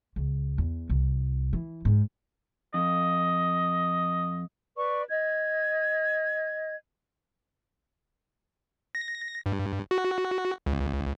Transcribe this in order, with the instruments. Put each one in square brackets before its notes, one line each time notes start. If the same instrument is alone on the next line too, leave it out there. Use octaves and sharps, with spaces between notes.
[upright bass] C#2
E2
C2
E3
G#2
[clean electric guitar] F2 [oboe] D#5
[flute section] B4 D5 C#6
D#5 G#6
[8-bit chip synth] A#6
G2
F#4
C#2